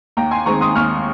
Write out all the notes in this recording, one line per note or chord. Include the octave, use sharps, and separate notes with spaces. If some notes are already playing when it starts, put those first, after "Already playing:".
D#2 G5 A#5
G#5 C6
D#3 G#3 C4 A#5 C#6
C6 D#6
D#2 C#6 F6